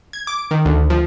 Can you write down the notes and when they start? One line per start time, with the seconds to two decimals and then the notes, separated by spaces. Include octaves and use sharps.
0.13 G#6
0.27 D6
0.51 D#3
0.65 D2
0.90 F3